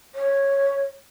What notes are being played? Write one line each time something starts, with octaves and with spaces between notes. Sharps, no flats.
C#5